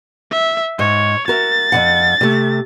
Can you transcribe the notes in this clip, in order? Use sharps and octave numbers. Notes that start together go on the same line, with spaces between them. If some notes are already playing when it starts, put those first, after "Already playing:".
E5
G#2 C#5
F#4 A#4 E5 A6
F2 E3 F#5
C3 A3